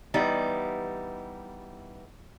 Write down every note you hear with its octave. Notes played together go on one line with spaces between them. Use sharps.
E3 G3 B3 D#4